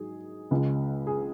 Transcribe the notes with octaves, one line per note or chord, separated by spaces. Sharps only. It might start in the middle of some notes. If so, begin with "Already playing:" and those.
Already playing: G#2 F#3 G#4
C#2 C#3 G#3
G#4